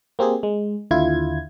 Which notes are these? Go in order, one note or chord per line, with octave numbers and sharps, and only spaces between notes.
A#3 C4 G4 G#4
G#3
D#2 D3 E4 F4 G#6